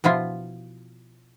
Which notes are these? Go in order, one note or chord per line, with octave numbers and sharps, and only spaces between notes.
B2 F3 E4 F4